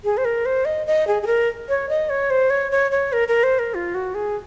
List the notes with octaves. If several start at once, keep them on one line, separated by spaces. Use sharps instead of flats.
G#4
C5
A#4
C5
D#5
D#5
G#4
G#4
A#4
C#5
D#5
C#5
C5
C#5
C#5
C#5
A#4
A#4
C5
A#4
F4
F#4
G#4